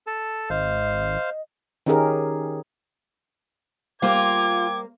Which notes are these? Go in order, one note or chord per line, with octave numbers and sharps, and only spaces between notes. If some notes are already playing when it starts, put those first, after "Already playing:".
A4 A5
G#1 C5 D#5 F5
D#3 C#4 D#4 G4 G#4 A#4
G3 A#3 F4 C5 G5 D6 G#6